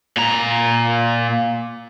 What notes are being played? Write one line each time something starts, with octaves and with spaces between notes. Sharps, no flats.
A#2 A#5